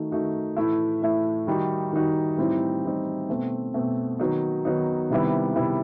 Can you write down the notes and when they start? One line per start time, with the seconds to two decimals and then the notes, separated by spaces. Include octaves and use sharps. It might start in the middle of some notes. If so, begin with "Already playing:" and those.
Already playing: D#3 A3 D#4 F#4
0.11 D#3 A3 D#4 F#4
0.57 A2 E3 A3 E4
1.02 A2 E3 A3 E4
1.47 D#3 G3 D#4 F#4
1.93 D#3 G3 D#4 F#4
2.38 A2 E3 G3 C4 D#4
2.83 A2 E3 G3 C4 D#4
3.29 B2 A3 C4
3.74 B2 A3 C4
4.20 D#3 F#3 B3 D#4
4.65 D#3 F#3 B3 D#4
5.11 C3 D#3 G3 B3 E4
5.56 C3 D#3 G3 B3 E4